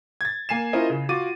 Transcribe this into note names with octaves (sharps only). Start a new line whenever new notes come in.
G#6 A6
A#3 G#5 C7 E7
C#4 E4 F4 A#4 C5 D#5
C#3
F4 F#4 D6 A6 D#7